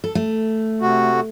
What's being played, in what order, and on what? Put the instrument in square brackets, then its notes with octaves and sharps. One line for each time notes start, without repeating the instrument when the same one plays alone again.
[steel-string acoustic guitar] A4
A3
[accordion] C3 F#4